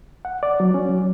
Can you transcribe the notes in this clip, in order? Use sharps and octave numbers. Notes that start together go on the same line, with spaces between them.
F#5
D5
F#3
C#4
F#3